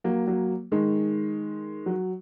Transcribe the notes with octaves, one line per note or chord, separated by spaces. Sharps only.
F#3 A#3
F#3 A#3
D#3 G#3
F#3